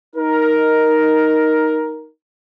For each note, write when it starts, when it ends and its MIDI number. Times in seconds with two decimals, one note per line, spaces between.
0.16 2.09 63
0.16 2.09 70